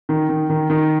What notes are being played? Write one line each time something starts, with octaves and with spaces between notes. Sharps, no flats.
D#3
D#3
D#3
D#3